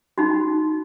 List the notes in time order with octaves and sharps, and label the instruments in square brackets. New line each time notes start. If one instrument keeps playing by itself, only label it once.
[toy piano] D#4 F#4